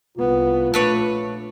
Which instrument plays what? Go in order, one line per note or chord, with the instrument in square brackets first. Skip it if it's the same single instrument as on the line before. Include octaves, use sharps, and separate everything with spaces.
[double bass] C2 B3 [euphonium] F4
[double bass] A#1 A3 [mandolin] D4 B4 C#5